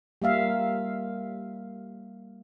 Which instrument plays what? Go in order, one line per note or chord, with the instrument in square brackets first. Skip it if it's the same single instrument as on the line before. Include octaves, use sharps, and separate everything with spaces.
[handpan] G3 A#3 E5 F5